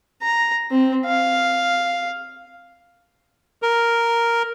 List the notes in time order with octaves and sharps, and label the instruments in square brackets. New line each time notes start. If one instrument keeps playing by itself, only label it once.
[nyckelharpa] A#5
C4
F5
[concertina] A#4